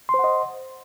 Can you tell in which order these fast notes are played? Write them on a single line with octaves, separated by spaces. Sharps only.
C6 C5 F#5 D#5